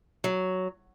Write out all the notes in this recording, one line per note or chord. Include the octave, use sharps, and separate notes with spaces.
F#3